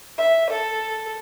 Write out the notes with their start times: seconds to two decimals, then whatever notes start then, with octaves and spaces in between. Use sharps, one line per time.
0.18 E5
0.50 A4